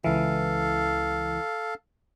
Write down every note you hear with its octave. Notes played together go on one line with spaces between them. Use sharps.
C#2 E3 A4 F5